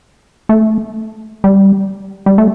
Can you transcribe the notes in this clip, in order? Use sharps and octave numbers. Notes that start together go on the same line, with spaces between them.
A3
G3
G3
A3